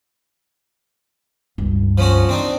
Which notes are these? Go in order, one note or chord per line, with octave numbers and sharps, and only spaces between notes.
C#2 G2
F3 C#4 F#4
C4 D4 D#4